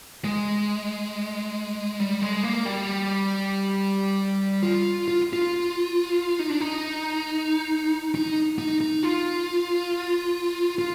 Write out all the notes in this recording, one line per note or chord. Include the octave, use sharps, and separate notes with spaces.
G#3
G3
G#3
A#3
G3
F4
F4
F4
D#4
D4
D#4
D#4
D#4
D#4
F4
F4